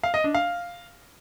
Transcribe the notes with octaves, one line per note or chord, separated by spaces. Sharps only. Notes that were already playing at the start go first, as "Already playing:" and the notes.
F5
D#5
D4
F5